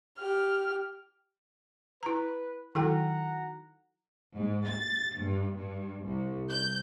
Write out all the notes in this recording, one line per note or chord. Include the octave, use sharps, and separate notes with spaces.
G4 F6
E4 B4 A#5
D#3 F#3 E4 A4 F#5 G5 A#5
G#2
A6
G2
G2
C2
G6